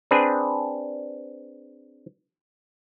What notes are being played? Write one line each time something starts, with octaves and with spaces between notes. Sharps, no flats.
C4 D4 G#4 B4